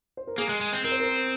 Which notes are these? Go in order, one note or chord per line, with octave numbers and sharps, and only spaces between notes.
C5
A#4
A#3 G#4
G#3
G#3
C4
C4 A#4
C5
A#4